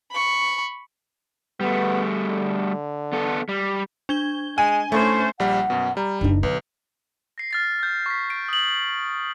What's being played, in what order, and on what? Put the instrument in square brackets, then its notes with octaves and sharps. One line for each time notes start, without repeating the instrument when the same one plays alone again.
[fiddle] B5 C#6
[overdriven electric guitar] G3 A3 [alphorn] B3
[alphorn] D3
[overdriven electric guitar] B3 A4
G3
[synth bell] D4 G#6 G7
[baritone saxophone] G#3 [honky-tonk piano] G#5
[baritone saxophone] A2 [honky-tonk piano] A3 [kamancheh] C#4 C5
[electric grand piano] A#1 G3 [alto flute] F#5
[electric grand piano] F#2 B2
[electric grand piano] G3 [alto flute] A#5
[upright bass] F#1 D#4 [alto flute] D4
[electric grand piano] B1 [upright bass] D3 [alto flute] B4
[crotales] A#6 C7
F6 A6 C7
F6 G6
C#6 B6
D7
D#6 F#7